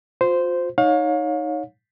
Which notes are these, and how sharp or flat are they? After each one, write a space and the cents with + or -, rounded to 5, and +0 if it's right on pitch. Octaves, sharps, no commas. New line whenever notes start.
F4 +35 C5 -10
D#4 +0 C#5 +0 F5 +35